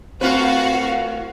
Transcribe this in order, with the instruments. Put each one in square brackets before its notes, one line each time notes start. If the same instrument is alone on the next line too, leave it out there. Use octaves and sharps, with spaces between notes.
[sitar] A2 F4 B4 [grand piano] C4 [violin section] F#4 F5